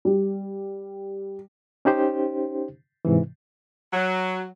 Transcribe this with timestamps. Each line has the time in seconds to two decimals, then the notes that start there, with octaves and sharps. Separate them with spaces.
0.05 G3
1.85 C#4 D#4 G4 C5
3.05 G#2 C3 E3
3.93 F#3